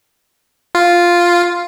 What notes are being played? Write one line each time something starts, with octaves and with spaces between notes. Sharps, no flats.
F4